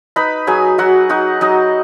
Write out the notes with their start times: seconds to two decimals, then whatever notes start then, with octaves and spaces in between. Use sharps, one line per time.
0.16 D#4 B4 B5
0.47 F#3 G#4 G#5
0.78 F#3 F#4 F#5
1.09 D#4 F#4 F#5
1.41 F#3 D#4 D#5